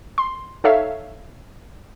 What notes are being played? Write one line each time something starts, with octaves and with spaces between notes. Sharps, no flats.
C6
D#4 A4 C#5 E5 F5